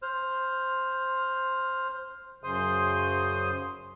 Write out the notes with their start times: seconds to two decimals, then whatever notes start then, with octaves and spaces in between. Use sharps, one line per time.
0.02 C5 F6
2.44 F#2 C#3 C5 C6 D#6